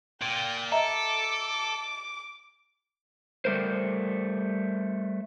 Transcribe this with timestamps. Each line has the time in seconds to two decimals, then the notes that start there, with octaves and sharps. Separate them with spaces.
0.22 A#2 G5 D7
0.72 A4 D#5 E5 A#5 D6
3.45 G3 A3 A#4 C5